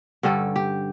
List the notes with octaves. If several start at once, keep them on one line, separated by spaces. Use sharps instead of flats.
G2 D3 G3 C#4 A4
G4